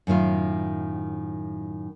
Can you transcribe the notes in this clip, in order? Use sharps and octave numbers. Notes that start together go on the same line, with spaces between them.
F#2 A2 D#3 F4